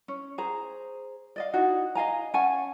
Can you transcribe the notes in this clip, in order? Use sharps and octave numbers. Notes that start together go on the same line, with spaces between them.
C#4
G#4 C5 A#5
D5 D#5 F5
D#4 E4 F#4
D#5 F5 G#5 A#5
C#4 F#5 G#5 A5